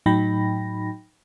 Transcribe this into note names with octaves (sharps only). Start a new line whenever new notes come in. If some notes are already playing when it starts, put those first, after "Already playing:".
A2 F#3 D#4 G5 B5 A#6